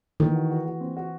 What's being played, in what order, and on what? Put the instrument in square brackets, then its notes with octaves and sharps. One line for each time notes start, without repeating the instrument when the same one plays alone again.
[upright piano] D#3 [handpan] E3
[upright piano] F#4
F#4
F#4
C4
F#4